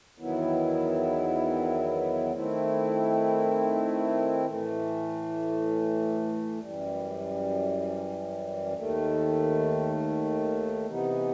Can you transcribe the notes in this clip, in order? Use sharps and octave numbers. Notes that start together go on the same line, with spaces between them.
E2 D#3 F#3 B3 E4
D#3 A3 C4 E4
A2 E3 A3
F#2 E3 G3
D#2 D#3 A3
C3 E3 B3 D#4